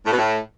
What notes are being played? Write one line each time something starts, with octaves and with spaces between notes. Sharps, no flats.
A2
B2
A2